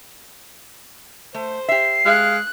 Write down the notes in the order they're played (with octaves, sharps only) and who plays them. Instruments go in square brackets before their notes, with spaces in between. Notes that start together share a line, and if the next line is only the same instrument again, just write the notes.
[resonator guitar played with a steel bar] A3 [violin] C5
[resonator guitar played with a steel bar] G4 E5 [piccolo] C7
[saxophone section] G#3 F5 [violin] F#6